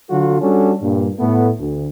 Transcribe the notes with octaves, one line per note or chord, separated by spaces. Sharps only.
D3 F#3 F4 F#4 A4
G3 C#4 D4 F#4 A4
G2 A#2
A2 A3 B3
D2